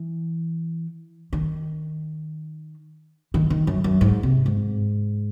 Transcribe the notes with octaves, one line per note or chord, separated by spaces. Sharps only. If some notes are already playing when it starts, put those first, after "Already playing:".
Already playing: E3
D#3
D#3
D#3
F#2
F#2
G#2
C3
G#2